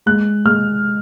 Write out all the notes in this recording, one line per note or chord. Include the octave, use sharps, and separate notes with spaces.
G#3 F#6
G#3 F6